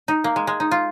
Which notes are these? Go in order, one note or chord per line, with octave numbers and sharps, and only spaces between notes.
D#4
A#3
G#3
G#3
D#4
F4